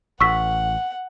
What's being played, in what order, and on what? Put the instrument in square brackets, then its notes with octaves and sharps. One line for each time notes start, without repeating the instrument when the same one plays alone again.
[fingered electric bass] A1 [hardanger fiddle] F#5 [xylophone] C#6 E6 B6